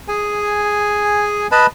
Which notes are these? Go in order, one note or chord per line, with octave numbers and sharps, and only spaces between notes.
G#4 G#5
B4 D#5 A5 B5